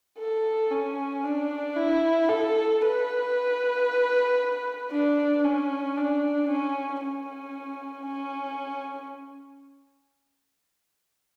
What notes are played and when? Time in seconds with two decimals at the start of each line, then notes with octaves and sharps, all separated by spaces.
0.19 A4
0.71 C#4
1.24 D4
1.77 E4
2.29 A4
2.82 B4
4.92 D4
5.44 C#4
5.97 D4
6.49 C#4
7.01 C#4
8.07 C#4